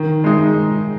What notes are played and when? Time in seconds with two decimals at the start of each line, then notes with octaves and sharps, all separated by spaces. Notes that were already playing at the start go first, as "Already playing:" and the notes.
Already playing: D#3
0.24 G#3 D#4